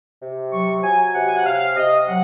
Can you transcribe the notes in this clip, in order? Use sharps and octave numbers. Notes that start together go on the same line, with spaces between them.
C3
F#3 C#6
F#3 G#5
C3 F#5
G#5
F#5
C3 F5
C3 D#5
F#3 F#5